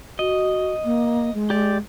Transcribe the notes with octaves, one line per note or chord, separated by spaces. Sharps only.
F#4 D#5
A#3
G#3
G4 D5